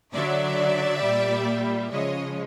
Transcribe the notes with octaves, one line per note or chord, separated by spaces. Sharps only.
D3 F#3 D5 E5
A#2 G3
C#3 F3 G#3 C#5 D#5